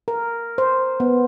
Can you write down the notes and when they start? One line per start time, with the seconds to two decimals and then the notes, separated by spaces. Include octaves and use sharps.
0.08 A#4
0.58 C5
1.00 B3